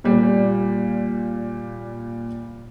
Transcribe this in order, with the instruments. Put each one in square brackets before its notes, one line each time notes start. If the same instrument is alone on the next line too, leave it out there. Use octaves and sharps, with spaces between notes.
[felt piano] A#2 G3